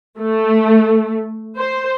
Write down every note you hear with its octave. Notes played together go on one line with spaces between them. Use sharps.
A3
C5